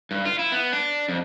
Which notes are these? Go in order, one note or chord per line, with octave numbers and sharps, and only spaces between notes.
G2
F4
E4
B3
D4
F2